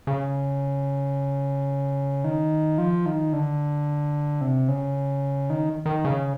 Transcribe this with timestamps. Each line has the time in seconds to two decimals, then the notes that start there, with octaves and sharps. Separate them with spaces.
0.07 C#3
2.24 D#3
2.78 F3
3.06 D#3
3.33 D3
4.41 C3
4.68 C#3
5.50 D#3
5.86 D#3
6.05 C#3